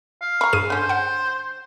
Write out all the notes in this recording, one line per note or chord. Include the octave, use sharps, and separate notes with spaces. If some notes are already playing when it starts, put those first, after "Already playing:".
F5
A#5 B5 C#6
G2 G#4 D#7
D3 C#4 C5
F#5 G5